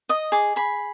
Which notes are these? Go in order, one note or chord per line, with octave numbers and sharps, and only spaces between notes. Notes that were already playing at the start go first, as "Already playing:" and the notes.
D#5 D#6
G#4 D6
G#4 B5